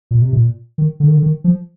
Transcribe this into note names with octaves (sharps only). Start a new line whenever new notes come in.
A#2
C3
A#2
D#3
D3
D#3
D3
D#3
F3